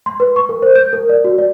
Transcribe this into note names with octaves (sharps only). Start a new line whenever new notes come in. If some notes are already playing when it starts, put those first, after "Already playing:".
C6
B4
C#6
A#4
C5
G6
A#4
D5
F#4
D5